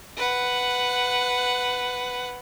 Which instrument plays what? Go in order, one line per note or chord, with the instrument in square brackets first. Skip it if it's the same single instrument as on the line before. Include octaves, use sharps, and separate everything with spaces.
[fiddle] B4 F#5